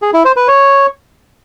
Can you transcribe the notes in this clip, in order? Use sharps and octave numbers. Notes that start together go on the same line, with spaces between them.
G#4
E4
C5
B4
C#5